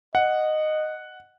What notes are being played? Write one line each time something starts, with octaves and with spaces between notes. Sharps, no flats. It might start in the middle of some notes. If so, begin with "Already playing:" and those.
D#5 F#5